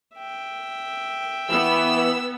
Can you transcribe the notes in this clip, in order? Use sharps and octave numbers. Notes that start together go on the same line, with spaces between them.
E5 G5
E3 B3 E6